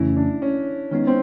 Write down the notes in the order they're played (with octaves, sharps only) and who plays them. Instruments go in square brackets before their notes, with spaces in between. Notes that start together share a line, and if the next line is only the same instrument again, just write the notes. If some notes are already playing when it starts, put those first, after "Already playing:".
Already playing: [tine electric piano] F2 C#3 E3 A3 C#4 [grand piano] E4
[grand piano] D4
C#4
[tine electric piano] D#3 G#3 B3 D#4 [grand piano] C#4
[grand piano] C4